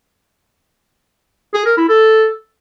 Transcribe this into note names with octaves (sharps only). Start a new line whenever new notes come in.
G#4
A#4
E4
A4